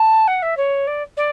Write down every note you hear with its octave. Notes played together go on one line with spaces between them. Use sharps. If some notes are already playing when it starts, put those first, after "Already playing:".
Already playing: A5
F#5
E5
C#5
D5
D5